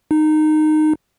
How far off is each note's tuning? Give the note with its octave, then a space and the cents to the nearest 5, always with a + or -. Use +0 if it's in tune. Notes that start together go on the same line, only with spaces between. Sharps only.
D#4 -15